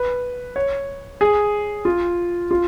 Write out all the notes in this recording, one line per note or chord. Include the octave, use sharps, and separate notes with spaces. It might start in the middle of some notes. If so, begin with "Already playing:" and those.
Already playing: B4
C#5
G#4
F4
F4